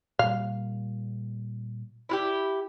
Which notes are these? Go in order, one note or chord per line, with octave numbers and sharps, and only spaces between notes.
A#2 G3 F5
E4 F4 G4